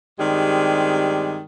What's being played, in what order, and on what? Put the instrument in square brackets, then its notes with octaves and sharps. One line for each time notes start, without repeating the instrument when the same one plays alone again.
[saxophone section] G2 D#3 G#3 C4 G4 D5